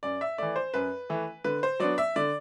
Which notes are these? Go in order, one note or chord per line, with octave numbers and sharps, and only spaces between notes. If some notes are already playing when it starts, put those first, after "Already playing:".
F#2 D5
E5
E3 A3 D5
C5
F#2 B4
E3 A3
D3 B4
C5
F#3 B3 D4 D5
E5
D3 D5